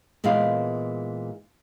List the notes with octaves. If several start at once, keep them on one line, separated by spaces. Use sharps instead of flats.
A#2 E3 G#3 B3 F5